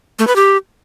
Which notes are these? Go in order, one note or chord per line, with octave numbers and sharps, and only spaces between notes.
A3
B4
G4